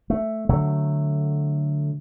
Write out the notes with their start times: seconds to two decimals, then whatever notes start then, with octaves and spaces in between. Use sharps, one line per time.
0.10 A3
0.49 D3 F#3 A3